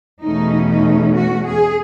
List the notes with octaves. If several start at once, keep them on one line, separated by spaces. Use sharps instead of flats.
E2 B2 A3 C#4 D#4
D#4
F#4
G#4